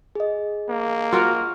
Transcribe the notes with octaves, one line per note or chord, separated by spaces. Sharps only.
G#4 D#5
A#3
F4 F#4 A#4